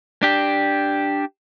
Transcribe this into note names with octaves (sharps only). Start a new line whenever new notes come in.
D4 G4